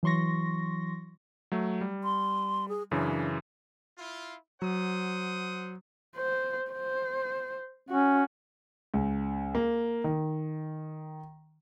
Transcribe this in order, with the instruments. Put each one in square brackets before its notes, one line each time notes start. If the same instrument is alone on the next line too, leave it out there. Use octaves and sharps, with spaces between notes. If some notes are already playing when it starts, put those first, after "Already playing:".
[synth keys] E3 F#3 C6 C#6 A#6
[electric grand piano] F#3 A3
G3
[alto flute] C6
G#4
[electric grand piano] F#2 C#3 E3 [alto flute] D4
[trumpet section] E4 F4
[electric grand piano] F#3 [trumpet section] C5 F#5 D#6
[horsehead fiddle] C5
C5
[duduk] C#4 [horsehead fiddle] F#4
[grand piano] C#2
A#3
D#3